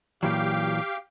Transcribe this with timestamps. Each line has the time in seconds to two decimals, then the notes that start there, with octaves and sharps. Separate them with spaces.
0.23 A#2 E3 F#3 G4 F5 G5